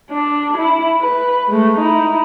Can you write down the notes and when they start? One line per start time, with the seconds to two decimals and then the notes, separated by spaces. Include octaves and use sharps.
0.10 D4
0.58 E4
1.01 B4
1.48 G#3 A3
1.79 D#4 E4